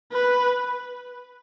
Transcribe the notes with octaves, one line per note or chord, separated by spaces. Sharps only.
B4